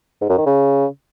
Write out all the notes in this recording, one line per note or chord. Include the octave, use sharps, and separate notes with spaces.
G#2
F#2
D#3
C#3